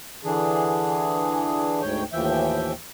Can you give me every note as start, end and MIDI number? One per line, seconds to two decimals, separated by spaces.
0.24 1.81 50
0.24 1.81 52
0.24 1.81 62
0.24 1.81 68
1.82 2.03 38
1.82 2.03 44
1.82 2.03 73
1.82 2.03 79
2.13 2.72 39
2.13 2.72 45
2.13 2.72 52
2.13 2.72 53
2.13 2.72 76
2.13 2.72 79